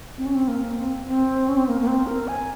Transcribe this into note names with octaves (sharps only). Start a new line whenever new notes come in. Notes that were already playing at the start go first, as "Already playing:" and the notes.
C4
C#4
C4
A#3
C4
C4
C#4
C4
A#3
A#3
C4
A#4
G#5